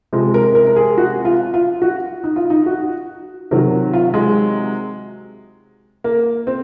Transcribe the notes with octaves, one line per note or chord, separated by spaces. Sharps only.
C3 F3 G#3
A#4
A#4
A#4
G#4
F#4
F4
F4
F#4
D#4
F4
D#4
F#4
C3 D#3 F#3 A#4
F4
G#3
A#3
C4